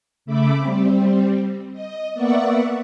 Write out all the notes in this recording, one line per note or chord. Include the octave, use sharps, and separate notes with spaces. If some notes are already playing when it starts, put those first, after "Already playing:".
C#3 A3 E5 B5 D6
G3 C4
D#5
A#3 B3 D5 E5 F#5 C#6